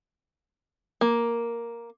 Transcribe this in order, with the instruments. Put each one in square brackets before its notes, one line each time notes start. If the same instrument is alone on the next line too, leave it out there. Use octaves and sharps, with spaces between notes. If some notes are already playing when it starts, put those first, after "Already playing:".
[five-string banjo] A#3